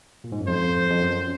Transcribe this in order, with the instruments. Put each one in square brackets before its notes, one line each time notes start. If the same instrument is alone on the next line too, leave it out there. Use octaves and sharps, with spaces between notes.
[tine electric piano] A#2
G#2
F#2
[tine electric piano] F2 [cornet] C5
[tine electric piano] F2
F#2